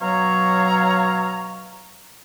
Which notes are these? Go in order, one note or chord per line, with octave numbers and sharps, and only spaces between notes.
B2 F#3 C#5 F5 A#5